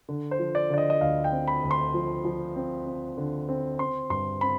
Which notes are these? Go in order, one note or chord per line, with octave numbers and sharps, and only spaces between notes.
D3
C5
F3
D5
D3 D5
D#5
D#5
D2 F5
G5
C4
B5
D2
C6
F3
F3
C4
C4
D3
C4
C4 C6
G2 C6
C4 B5